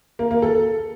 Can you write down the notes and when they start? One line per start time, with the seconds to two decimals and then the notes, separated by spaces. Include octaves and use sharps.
0.19 A#3
0.31 A#3
0.42 A4